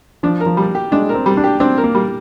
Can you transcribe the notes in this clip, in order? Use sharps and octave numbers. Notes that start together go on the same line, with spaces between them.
F3 D4
A#4
F3
G3
G4
G#3 D4
A#4
C4
G3
D4
G4
C4 D4
A#4
A#3
G3